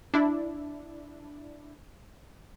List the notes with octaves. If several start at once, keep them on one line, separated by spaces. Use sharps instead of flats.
D4 E4